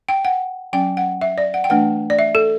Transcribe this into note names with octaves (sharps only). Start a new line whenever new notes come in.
G5
F#5
F#3 C#4 G5
F#5
E5
D5
F#5
G5
E3 A3 D4 F#5
D5
E5
A4